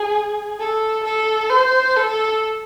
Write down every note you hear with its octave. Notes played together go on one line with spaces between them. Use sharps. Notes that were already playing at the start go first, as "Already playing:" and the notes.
Already playing: G#4
A4
A4
C5
A4